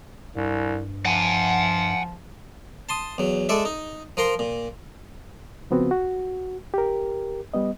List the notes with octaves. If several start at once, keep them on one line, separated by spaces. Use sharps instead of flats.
C2 G2
F3 F#5 G#5
A5 C6 D#6
E2 F#3
G#3 A4 D5 E5
D#4
F3 A#4 A#5 C6
A#2
C#3 F3 B3 C4 F#4
F#4
G4 A#4
G3 B3 D#5